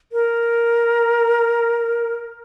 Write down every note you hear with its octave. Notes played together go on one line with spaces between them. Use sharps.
A#4